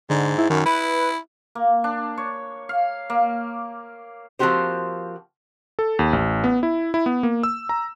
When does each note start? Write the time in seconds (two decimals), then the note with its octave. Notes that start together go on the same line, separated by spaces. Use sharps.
0.10 G#2 D3
0.38 E4
0.50 F#2 D#3
0.66 E4 B4
1.55 A#3
1.84 D4
2.18 C#5
2.69 F5
3.10 A#3
4.39 F3 A#3 C4 F#4 G4 C5
5.79 A4
5.99 D#2
6.13 A1
6.44 B3
6.63 E4
6.94 E4
7.06 B3
7.23 A#3
7.43 E6
7.69 A#5